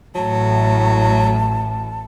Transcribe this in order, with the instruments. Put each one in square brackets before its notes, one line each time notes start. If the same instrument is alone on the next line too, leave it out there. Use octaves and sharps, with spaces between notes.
[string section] A1 A2 [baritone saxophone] F#3 [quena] A5